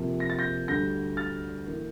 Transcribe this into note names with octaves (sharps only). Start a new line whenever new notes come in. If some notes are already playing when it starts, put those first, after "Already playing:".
Already playing: F2 C3 F3 A#3
A#6
A6
G6 A#6
D2 D3 G3 G6 A#6
F6 A6
E3 A#3